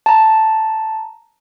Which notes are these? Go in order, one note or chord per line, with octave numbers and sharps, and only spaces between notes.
A5 A#5